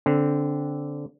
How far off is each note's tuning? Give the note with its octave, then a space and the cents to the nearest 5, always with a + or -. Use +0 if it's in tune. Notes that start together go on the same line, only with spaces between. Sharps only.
D3 -15 C4 +0